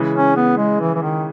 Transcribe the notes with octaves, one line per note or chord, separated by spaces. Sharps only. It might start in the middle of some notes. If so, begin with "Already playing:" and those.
Already playing: C#3 E3 G#3
C#4
B3
G#3
E3
E3
D#3